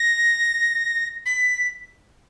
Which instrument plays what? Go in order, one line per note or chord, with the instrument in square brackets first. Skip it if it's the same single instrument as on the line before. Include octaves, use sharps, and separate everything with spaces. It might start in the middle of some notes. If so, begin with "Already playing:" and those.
Already playing: [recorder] A#6
B6